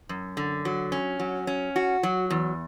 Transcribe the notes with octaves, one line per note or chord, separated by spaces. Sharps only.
F#2
D3
F#3
C#4
F#3
C#4
F#4
F#3
E2